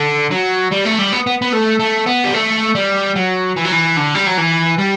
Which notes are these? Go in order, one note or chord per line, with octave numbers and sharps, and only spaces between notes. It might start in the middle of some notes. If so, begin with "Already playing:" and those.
Already playing: D3
F#3
G3
A3
G3
B3
B3
B3
A3
A3
B3
G3
A3
G3
F#3
E3
F#3
E3
D3
G3
F#3
E3
G3